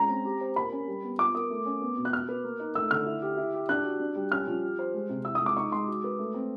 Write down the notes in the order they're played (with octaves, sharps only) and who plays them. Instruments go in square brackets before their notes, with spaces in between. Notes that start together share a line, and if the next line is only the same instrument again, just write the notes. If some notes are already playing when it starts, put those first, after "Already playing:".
Already playing: [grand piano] G#3 C#4 [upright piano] A#5
[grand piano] C4
G4
C5
[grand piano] A#3 [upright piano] B5
[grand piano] C#4
G3
B3
[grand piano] F4 [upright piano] D6
[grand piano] A#4 [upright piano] D#6
[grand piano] A3
C#4
B3
B2
[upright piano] F#6
[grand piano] F#4 [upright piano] F6
[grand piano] B4
A#3
D#4
[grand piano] A3 [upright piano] E6
[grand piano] D3 [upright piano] F6
[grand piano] E4
G4
E4
G4
[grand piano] D4 [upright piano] F#6
[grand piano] F#4
D4
G3
[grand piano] C#4 [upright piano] F6
[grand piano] F3
G4
C5
G#3
C3
[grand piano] E4 [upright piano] E6
[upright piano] D#6
[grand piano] G#3
[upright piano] D6
[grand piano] D#4 [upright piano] C#6
[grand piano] G#3 [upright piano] C6
[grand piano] F#4
B4
A3
C4